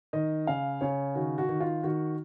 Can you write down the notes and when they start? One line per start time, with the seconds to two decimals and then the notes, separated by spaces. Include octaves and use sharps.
0.13 D#3 D#5
0.47 C#3 F5
0.81 C#3 C#5
1.15 D#3 F#4
1.38 F#4
1.49 D#3
1.60 F4
1.83 D#3 F#4